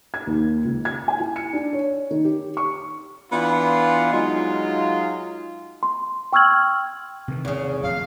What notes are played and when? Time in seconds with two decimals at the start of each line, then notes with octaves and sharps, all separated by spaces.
0.14 G#6
0.27 D#2
0.64 C#2
0.85 G#6
1.08 G#5
1.20 E4
1.36 C#7
1.53 D4
1.73 C#5
2.11 D#3
2.25 G4
2.57 C#6
3.31 E3 B3 D4 E4 F4
4.12 F#3 G#3 D#4 F4
5.83 C6
6.33 G5 C#6 E6 F6 G#6 F#7
7.28 C3 D#3 E3
7.45 E2 C#3
7.83 D1 F2 F5